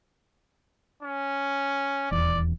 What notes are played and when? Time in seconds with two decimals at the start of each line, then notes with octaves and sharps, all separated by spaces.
1.03 C#4
2.11 D#1 E2 D5